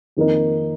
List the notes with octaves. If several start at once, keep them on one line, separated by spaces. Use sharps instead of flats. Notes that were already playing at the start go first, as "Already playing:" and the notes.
F2 D#3 A#3 D#4 A#4